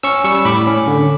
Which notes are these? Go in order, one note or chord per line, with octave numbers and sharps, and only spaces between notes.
C#4 C#6 E6
G3 C#6 E6
E6
A2 B5 D6
C#4
D3